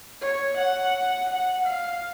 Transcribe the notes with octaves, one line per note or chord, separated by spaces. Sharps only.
C#5
F#5
F#5
F5